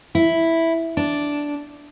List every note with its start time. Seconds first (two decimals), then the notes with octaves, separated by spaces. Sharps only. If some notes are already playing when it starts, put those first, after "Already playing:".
0.15 E4
0.97 D4